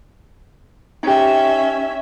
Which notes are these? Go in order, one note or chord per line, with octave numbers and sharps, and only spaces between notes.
C#4 D#4 G4 E5